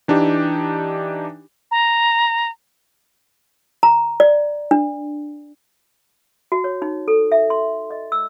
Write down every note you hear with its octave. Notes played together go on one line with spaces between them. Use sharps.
E3 D4 D#4 G4
A#5
A#5
D5
D4
F#4
C#5
D#4
A4
E5
C6
D#5
E6